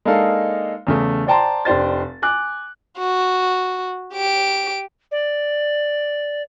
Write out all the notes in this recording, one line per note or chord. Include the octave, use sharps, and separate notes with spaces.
G#3 A#3 D4 D#4 A4 F5
E2 C#3 A3
C5 D5 G5 A5 A#5 C6
F1 D4 G4 C5 A6
G#5 D6 F#6
F#4
G4 D7
D5